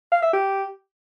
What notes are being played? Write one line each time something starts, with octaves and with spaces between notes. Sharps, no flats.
F5
E5
G4